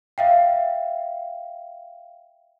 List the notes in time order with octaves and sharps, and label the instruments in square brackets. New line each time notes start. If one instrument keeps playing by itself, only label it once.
[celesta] E5 F5 G5